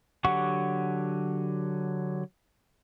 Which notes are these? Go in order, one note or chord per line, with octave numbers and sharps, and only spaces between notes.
D3 F#3 G4 F#5 C#6